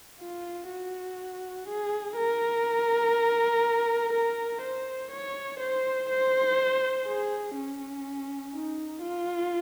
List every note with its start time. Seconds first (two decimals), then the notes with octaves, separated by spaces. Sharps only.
0.21 F4
0.70 F#4
1.68 G#4
2.17 A#4
4.13 A#4
4.62 C5
5.12 C#5
5.60 C5
6.10 C5
7.07 G#4
7.56 C#4
8.54 D#4
9.03 F4